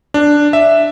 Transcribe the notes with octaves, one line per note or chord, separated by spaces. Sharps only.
D4
E5